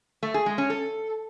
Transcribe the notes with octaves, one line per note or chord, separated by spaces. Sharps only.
A3
G#4
G#3
C#4
A4